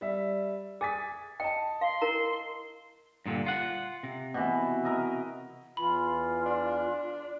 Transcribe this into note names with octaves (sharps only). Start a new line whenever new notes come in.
G3 E5
G#4 G#5 D#6 A6 B6
D#5 G5 A5
F5 C6
E4 A#4 A#5
G2 A#2 D3
F4 F#5
C3
B2 E3
A#4 D#5 E5
E2 E3 F4 B5
D4